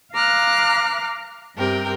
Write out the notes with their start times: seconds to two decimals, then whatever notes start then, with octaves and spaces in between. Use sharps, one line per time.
0.14 F5 A#5 D6 F6 F#6
1.56 G2 C3 A#4 G5